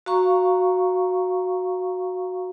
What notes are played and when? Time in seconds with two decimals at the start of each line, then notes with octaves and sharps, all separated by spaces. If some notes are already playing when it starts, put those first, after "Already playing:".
0.06 F#4 F5 A#5 C#6